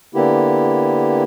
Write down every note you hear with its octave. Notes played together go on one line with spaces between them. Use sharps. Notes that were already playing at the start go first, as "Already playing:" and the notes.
D3 A#3 B3 E4 G4